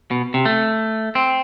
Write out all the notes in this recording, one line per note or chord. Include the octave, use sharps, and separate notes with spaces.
B2
C3
A3
C4